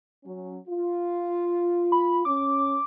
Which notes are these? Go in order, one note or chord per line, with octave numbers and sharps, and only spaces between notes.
F#3 C#4
F4
B5
C#4 D6